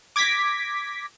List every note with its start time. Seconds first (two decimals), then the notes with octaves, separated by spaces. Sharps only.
0.16 D6 G#6 A#6 B6